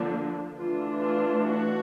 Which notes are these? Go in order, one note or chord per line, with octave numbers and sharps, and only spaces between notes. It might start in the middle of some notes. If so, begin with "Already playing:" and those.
Already playing: D3 F3 A#3 D4
E3 A3 D4 F4
F4
F#4